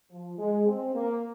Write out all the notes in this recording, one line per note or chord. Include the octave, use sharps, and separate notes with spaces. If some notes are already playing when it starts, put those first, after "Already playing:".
F3
G#3
C4
A#3